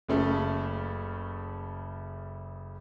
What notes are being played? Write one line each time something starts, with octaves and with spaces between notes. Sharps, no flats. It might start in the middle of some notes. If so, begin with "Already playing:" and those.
F#1 C#3 A3